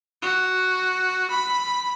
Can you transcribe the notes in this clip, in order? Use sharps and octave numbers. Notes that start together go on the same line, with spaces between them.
F#4
B5